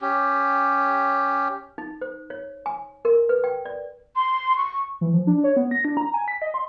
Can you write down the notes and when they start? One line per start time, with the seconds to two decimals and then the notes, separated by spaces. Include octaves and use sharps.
0.01 C#4 G4
1.78 D#4
2.01 C5
2.30 C#5
2.66 G#5
3.05 A#4
3.29 B4
3.44 G5
3.65 D5
4.17 C6
4.57 C#6
5.01 E3
5.13 F3
5.27 D4
5.44 C#5
5.56 B3
5.71 A#6
5.85 D4
5.97 A#5
6.14 G#5
6.28 B6
6.42 D#5
6.54 C6